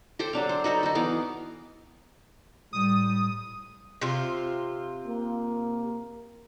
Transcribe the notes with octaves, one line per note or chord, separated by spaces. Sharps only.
G4 A4 C5 G5
F#3 D4 F5
C5
D#4 F#4 A4 B4
D#4 F#4
E3 B3 F5 D6
A2 G3 D#6
C3 F4
A#3